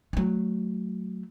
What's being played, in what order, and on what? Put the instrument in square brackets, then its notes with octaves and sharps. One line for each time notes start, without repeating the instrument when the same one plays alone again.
[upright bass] F#3 A3